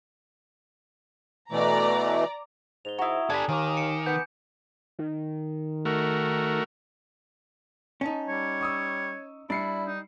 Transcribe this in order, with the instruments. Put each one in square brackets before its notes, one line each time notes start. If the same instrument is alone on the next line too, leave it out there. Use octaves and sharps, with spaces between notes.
[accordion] B2 E3 A3 [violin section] D5 A#5
[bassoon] G#2 [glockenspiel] F7 G7
[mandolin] E4 F#4 [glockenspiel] A#5 D#6
[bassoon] D4 [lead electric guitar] G4 A4 [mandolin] G#5 B5
[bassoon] D#2 [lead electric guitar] D#3 [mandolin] F5 [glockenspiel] G#5 D6
[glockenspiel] C#7 D7 E7
[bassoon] B3 [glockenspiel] G6 C#7
[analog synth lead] D#3
[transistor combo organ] A3 F#4 A#4
[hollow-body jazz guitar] C#4 D#4 [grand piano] G#5 A5
[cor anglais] G3 [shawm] C#5
[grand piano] C#6 D#6 E6
[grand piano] G3 C7 C#7 [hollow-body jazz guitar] D4 [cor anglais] E4
[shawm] D#4